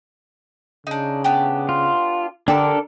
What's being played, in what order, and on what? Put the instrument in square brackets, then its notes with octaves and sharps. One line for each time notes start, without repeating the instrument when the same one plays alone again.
[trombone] C#3 [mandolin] D4 D#4
[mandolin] B3 D4 G4
[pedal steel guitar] F4
[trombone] D3 [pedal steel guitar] D4 A4 A#4 [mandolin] G4 A5